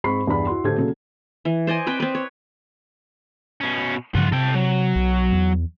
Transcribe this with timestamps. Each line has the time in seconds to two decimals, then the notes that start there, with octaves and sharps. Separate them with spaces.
0.04 G#2 G#3 C4 B5 C#6 C7
0.27 E2 G2 D5 B5
0.47 E4 F#4 C6
0.64 A2 D3 A3 G4 C5 G#6
0.78 A#2 C#3 F#3 A4
1.45 E3
1.67 C5 D5 D#5 G#5
1.86 C4 B4 G5
2.00 C4 B4
2.15 C#5
3.61 B2 C#4
4.15 G2 C#3 F3 F4 F#4
4.32 C3 A4 G5
4.54 F#3
4.96 B1
5.32 E2